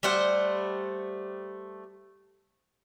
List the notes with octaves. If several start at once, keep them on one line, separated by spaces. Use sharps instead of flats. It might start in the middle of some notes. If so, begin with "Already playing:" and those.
G3 A3 C5 F#5